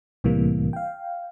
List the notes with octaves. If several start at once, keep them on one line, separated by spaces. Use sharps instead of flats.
C2 A2 C3 E3 G3 A#3
F5 G5